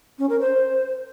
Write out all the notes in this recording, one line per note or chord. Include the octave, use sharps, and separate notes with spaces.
C#4
A#4
C5